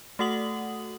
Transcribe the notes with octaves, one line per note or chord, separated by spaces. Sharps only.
A3 F#4 A4 F#5 D#6 F#7